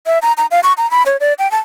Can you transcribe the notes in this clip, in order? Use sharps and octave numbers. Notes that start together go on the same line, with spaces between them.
E5
A#5
A#5
F5
C#6
A#5
B5
C#5
D5
G5
A5